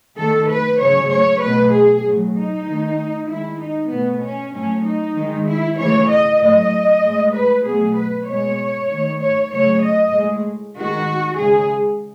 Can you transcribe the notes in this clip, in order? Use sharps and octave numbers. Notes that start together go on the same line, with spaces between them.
D#3 A3 A4
B4
C#3 F#3 A3 C#5
C#5
B2 F#3 A3 B4
G#4
A2 F#3 A3
D#4
D#3 A3
D#3 G#3 E4
D#4
B2 A3 B3
C#4
A2 F#3 A3 C#4
D#4
D#3 G#3
E4
C#3 E3 A3 C#5
D#5
A2 F#3 A3 D#5
A2 G#3
B4
B2 F#3 A3 G#4
B4
B2 G#3 C#5
D#3 A3
C#5
C#3 F#3 A3 C#5
D#5
A2 G#3
D#3 G#3 F#4
C#3 G#3 G#4